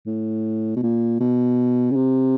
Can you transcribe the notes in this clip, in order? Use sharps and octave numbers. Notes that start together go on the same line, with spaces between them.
A2
B2
A#2
B2
C#3
C3